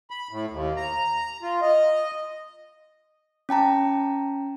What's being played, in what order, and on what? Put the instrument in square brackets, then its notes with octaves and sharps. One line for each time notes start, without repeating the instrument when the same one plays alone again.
[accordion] B5
A2
D#2
A#5
F4
D#5
[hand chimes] C#4 G5 A5 A#5